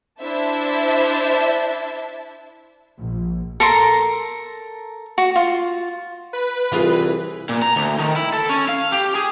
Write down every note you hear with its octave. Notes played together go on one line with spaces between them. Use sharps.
D4 E4 C5 E5 A5
A#1
A4 A#4 A#5 C6
F#4
F4
B4
C2 E3 F4 G#4
A#2
A#5
D2
D#3
E4
A4
C#4
F5
G4
G#4